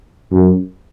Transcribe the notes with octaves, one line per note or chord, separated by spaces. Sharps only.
F#2